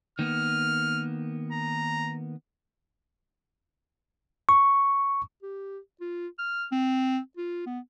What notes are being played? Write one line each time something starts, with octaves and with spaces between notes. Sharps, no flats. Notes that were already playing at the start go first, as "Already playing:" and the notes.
D#3 A#3 B3 F6
A#5
C#6
G4
F4
F6
C4
F4
B3